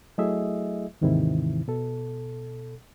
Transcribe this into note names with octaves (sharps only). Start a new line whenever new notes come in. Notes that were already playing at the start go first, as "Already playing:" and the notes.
F#3 A3 E4 G#4 D#5 E5
D#2 G#2 C3 D#3 E3 E4
B2 A4